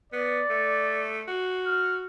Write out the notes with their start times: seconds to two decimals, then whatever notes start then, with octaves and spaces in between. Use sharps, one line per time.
0.13 B3 D5
0.50 A3
1.27 F#4
1.66 F6